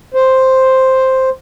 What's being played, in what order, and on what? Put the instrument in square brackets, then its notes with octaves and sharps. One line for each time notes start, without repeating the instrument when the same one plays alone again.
[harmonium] C5